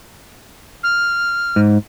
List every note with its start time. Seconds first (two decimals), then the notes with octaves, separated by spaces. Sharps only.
0.83 F6
1.56 G#2